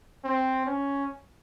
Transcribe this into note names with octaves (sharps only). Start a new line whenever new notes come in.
C4
C#4